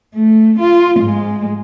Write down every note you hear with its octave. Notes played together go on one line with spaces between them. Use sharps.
A3
F4
G#2 G#3